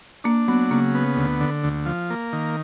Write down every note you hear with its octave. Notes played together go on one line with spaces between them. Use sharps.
A#3 D4
F#3 B3
C#3 A#3
B3
D2
D3
D2
F3
A#3
D#3